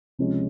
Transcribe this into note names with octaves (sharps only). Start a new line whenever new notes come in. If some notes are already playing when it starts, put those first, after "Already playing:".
C#2 C3 F3 G#3 C#4